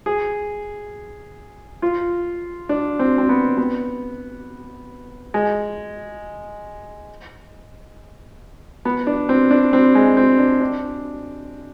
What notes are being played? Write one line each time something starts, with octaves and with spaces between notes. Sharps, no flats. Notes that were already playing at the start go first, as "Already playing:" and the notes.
G#4
F4
D4
C4
C4
B3
B3
G#3
B3
D4
C4
D4
C4
G#3
C4
D4
D4